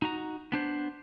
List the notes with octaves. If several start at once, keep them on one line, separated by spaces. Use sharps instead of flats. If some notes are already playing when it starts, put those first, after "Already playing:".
D#4 F#4 A#5
B3 D4 C5